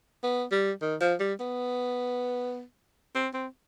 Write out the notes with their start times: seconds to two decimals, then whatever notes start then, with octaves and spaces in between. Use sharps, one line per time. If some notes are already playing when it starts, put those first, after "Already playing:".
0.23 B3
0.52 G3
0.82 D#3
1.01 F3
1.20 G3
1.40 B3
3.15 C4
3.34 C4